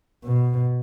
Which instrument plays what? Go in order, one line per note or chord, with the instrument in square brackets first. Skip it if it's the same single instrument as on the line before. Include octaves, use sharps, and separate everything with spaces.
[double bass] B2